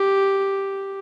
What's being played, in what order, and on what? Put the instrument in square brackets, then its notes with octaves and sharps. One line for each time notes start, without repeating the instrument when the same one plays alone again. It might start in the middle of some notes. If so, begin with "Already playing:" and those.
Already playing: [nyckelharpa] G4